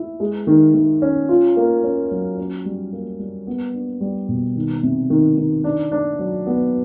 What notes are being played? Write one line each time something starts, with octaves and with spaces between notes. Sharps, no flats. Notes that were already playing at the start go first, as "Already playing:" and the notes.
Already playing: E4
G#3
D#3
D#3
C#4
F4
A#3
C#4
F#3
C#4
G3
A#3
G3
B3
D4
G3
B2
D#3
C3
D#3
D#3
D4
D4
F#3
B3